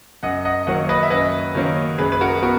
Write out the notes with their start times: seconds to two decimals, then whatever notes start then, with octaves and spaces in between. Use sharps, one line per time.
0.23 F#2 D#5 F#5
0.45 D#5 F#5
0.67 D#3 F#3 A#3 C#4 D#5 F#5
0.89 B4 D#5
1.03 E5
1.10 F#2 B4 D#5
1.55 D#3 F#3 A#3 C#4
1.98 F#2 G#4 B4
2.12 B4
2.21 F#4 A#4
2.42 B3 F#4 A#4